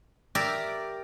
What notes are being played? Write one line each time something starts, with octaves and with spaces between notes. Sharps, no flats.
G4 A#4 D5 E5 A#5